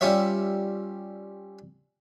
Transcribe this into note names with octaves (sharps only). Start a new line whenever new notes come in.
G3 C#4 F4 C#5 E5